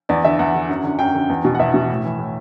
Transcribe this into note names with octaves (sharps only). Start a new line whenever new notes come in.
E2 D5
D3 E5
E2 F#5
D3
F#2
D3
F#2 G5
D3
E2
B2
F#5
E2 E5
B2
A2
E3
A2